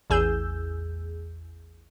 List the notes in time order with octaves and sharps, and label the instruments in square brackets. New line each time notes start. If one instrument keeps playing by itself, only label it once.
[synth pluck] A1 E2 G#4 E6 G6